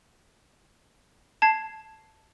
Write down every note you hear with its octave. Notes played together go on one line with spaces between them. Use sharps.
A5 G#6 C7